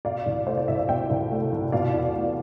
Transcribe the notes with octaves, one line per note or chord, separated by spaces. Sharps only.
B2 D5 F5
C2
A3 C5
D5
C2 E5
F5
B2 E5 G5
C2
A3
C2
B2 D5 F5
E2
A3